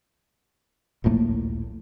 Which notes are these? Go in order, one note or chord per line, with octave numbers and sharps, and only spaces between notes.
D#1 A#1 A2 A#3